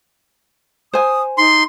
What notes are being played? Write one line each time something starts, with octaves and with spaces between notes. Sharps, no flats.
C5 G#5 D#6
D#4 C6